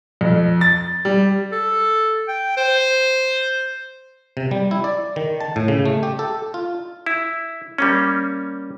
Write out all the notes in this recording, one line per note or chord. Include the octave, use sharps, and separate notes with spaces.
F2
A6
G3
A4
G5
C5
C3
G3
E4
D5
D#3
A5
A2
C#3
A3
G4
A4
F4
E4
G3 A#3 C#4